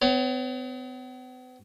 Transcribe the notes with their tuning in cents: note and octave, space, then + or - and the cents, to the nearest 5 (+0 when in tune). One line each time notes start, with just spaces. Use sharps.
B3 +45 C#5 +5